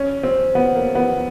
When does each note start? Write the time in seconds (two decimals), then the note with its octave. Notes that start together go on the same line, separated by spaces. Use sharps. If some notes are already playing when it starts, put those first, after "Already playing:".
Already playing: C#4
0.23 C4
0.55 B3
0.75 A#3
0.95 B3